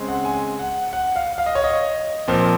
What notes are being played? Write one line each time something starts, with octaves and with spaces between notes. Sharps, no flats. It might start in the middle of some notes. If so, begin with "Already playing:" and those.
Already playing: C#3 G#3 C4
F#5
G#5
F#5
F#5
F5
F5
D#5
C#5
D#5
A#2 F3 C4